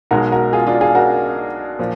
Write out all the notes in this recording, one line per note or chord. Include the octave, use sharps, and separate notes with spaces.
B1 B2 G#3 F#4 A#4
F#4 A#4
F4 G#4
D4 F4
F4 G#4
F#4 A#4
A#2 F3